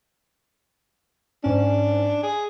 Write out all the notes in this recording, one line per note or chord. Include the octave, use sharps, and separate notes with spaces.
G#2 C#4 D4
G#4